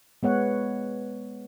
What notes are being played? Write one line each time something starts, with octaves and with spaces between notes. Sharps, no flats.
G#3 B3 C#5 F#5